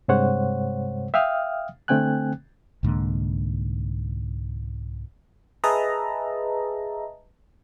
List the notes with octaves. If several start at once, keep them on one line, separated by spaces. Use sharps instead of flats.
G2 C3 G#3 C5 C#5 F#5
E5 F5 G5 D#6 F6
D3 A3 C4 G5 G#5 F#6
C2 G#2 D3 A#3
G#4 B4 D#5 E5 A5 A#5